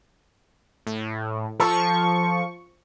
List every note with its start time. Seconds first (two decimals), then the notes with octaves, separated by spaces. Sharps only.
0.87 A2
1.60 F3 A4 C#6